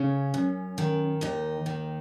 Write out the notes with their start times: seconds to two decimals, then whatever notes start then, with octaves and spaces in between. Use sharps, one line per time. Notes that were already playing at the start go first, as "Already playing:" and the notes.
Already playing: C#3 C#4
0.34 F#2
0.78 D#3
1.21 D#2 D#4
1.66 D#3